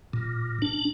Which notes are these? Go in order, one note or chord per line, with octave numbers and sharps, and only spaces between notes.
A#2
D4